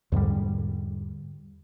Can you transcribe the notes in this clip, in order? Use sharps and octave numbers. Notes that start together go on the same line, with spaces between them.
E2 G#2 D3 G3